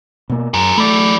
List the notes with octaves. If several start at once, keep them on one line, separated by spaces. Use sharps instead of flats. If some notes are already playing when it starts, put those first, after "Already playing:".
B2 A#3
F#2 G#4 A#4
E3 A3 D5